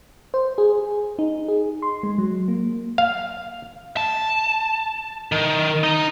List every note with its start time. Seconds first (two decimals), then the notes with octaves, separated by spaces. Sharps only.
0.34 C5
0.58 G#4
1.19 D#4
1.48 G#4
1.82 C6
2.03 G#3
2.18 F#3
2.48 A#3
2.98 F5
3.97 A5
5.32 D#3
5.83 D#4